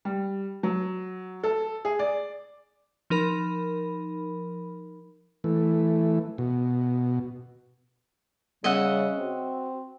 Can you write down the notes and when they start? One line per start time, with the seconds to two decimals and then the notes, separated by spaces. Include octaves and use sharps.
0.05 G3
0.63 F#3
1.43 A4
1.85 G#4
1.99 D5
3.10 F3 D#4 A#4 B5
5.44 E3 A3
6.38 B2
8.64 C#3 G3 D#5 E5 F#5
9.17 C4 F#4